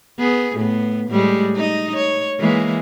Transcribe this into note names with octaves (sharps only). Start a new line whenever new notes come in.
B3 G#4
A2 B3
A2 G3 G#3
D#4 D#5
C#5
E3 G#3 A#3